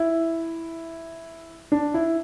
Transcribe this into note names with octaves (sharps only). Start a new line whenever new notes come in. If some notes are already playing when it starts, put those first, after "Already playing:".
Already playing: E4
D4
E4